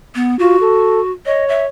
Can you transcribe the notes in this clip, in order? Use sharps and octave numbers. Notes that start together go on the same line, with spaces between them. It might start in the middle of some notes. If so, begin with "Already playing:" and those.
B3
F4 F#4
A4
C#5 D#5
E5